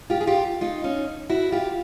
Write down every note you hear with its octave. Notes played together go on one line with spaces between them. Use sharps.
F4 G4
G#4
F4 G4
D#4 F4
C#4 D#4
E4 F#4
F4 G4